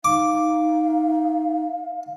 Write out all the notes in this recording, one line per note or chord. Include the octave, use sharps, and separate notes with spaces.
D#4 F5 D6